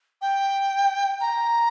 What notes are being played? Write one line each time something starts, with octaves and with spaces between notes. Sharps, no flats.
G5
A#5